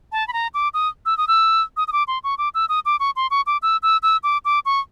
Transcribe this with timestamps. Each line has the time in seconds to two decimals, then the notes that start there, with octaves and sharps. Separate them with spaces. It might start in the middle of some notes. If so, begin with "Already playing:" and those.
0.12 A5
0.28 B5
0.33 A#5
0.54 D6
0.74 D#6
1.06 E6
1.18 D#6
1.28 E6
1.77 D#6
1.88 D#6
1.93 D6
2.08 C6
2.24 C#6
2.38 D6
2.55 E6
2.69 D#6
2.86 D6
3.00 C#6
3.16 C6
3.31 C#6
3.47 D6
3.62 E6
3.83 E6
4.03 E6
4.23 D6
4.45 D6
4.66 C#6